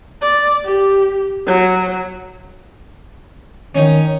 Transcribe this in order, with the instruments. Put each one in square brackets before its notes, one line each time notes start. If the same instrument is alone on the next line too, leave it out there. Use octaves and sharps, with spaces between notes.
[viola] D5
G4
F#3
[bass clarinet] D#3 [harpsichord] C#4 D#4